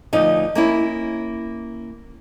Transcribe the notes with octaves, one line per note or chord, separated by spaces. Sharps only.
D2 F3 D#4 D#5
A#3 C#4 E4